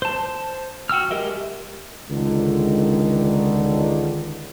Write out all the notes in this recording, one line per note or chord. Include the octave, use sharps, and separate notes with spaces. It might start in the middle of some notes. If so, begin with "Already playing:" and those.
C5 A5
F#4 G5 E6 F6
G#3 G4 A#4 D#5 E5
C#2 D3 D#3